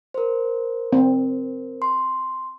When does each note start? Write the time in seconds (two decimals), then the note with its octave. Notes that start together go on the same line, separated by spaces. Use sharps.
0.14 A#4 C5
0.93 C4
1.82 C6